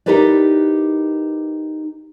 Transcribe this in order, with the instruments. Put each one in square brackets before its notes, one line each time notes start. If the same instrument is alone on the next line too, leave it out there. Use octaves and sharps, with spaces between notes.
[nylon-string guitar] D#4 E4 G4 A#4 B4 D5